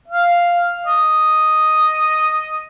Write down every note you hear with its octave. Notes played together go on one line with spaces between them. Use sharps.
F5
D#5